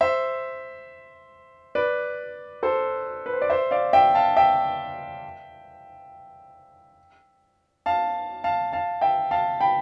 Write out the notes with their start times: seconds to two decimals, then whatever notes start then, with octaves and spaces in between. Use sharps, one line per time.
0.01 C5 E5
1.75 B4 D5
2.63 A4 C5
3.26 B4
3.33 C5
3.42 D5
3.50 C5 E5
3.71 D5 F5
3.93 E5 G5
4.15 F5 A5
4.37 E5 G5
7.86 F5 A5
8.44 F5 A5
8.73 F5 A5
9.01 E5 G5
9.31 F5 A5
9.61 G5 B5